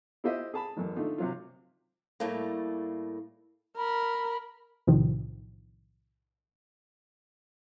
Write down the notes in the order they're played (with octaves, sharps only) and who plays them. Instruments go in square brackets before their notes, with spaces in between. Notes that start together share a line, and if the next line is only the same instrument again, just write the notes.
[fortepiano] E4 F4 G4 C5 D#5 E5
G#4 A5 B5
A1 F#2
D3 A3 D#4 F4
C3 F#3 F4
[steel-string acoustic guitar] A2 G3 A3 A#3
[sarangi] A#4 [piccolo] B5
[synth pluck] B1 A2 C3 D#3 F3